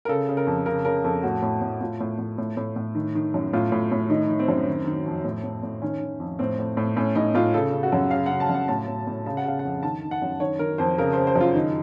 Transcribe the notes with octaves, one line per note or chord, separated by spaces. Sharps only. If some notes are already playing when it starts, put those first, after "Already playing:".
A#4
C#3 A4
C#3
A#4
F2
C#3 A#4
C#3 A#4
F2 A4
A2 F#4
A2
A2
A2 F4
A2
A2
A2
A2
A2
D#3
D#3
F#2
A2 F4
A2
A2
D#3 D#4
D#3
C4
F#2
D#3
D#3
F2
A2
A2
A2
D#3 C#4
D#3
F2
A2 C4
A2
A2
A2 C#4
A2 D#4
A2 F4
C#3 A4
C#3
F#4
F#2
C#3 F5
C#3 F#5
A5
F#2
F#5
A2 A5
A2
A2
C#3 A5
F#5
C#3 F5
F#5
F2
D#3 A5
D#3
F#5
F#2
D#3 C#5
D#3 A#4
F2 C5
C#3 A#4
C#3 C5
C5
F#2 F4
D#3 D#4